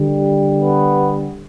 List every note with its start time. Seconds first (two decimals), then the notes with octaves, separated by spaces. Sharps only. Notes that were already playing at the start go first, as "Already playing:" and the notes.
Already playing: D3 G3
0.59 B3